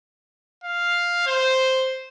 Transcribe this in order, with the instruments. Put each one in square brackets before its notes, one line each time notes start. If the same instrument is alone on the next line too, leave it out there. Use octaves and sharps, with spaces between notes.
[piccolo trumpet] F5
C5